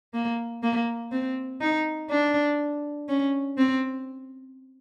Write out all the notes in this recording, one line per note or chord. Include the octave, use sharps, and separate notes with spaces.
A#3
A#3
C4
D#4
D4
C#4
C4